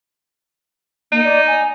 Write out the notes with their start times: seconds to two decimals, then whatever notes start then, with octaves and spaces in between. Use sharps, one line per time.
1.12 A#3 D#4
1.24 D5
1.47 G#5